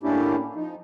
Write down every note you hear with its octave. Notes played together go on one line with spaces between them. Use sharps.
A2 A#3 C#4 D4 E4 G4
F3 D#4